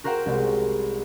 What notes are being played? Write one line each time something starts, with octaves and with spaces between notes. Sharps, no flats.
F#4 A#4 C5 F#5 G5 E7
C2 G#3